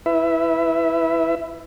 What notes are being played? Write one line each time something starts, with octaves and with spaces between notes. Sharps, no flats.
E4 B4 E5